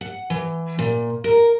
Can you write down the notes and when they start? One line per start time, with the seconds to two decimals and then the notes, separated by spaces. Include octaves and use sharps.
0.01 F#5
0.30 E3
0.79 A#2
1.24 A#4